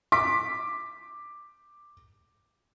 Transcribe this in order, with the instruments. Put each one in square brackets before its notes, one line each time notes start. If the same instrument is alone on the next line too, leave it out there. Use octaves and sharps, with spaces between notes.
[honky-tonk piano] D6 B6